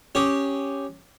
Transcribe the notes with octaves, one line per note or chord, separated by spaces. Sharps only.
C#4 G4 G#4